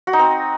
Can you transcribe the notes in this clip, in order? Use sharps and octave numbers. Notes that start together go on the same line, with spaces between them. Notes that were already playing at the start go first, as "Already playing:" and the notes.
F#4
D#4
C4